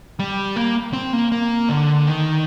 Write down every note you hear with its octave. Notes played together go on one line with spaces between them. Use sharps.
G3
A#3
C4
A#3
A#3
D3
D#3